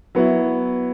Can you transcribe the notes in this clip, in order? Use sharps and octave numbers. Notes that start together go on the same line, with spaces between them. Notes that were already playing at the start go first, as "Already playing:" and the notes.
F#3 B3 E4